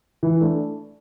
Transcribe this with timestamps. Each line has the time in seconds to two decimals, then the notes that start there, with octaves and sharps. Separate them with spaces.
0.23 E3
0.41 A3 D4